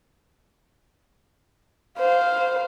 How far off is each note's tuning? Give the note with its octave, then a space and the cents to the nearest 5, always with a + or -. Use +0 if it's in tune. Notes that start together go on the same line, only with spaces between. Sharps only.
C5 -15 F5 +0